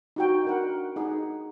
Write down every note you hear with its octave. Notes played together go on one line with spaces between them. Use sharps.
D#4 F#4 G5
D4 A#4 F#5
D#4 G#4 F#5